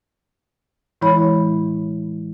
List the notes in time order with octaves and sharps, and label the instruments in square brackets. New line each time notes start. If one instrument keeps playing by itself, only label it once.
[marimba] A2 E3 G#3 E4 C#5 B5